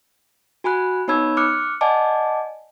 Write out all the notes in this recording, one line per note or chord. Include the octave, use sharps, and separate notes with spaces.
F#4 G#5 B5 F#6
B3 D#4 C#5 B5 E6 G#6
D6 F6 F#6 C#7
D5 D#5 F#5 G#5 A5 D6